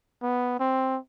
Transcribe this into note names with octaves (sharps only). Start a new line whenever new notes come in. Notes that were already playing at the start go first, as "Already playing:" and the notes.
B3
C4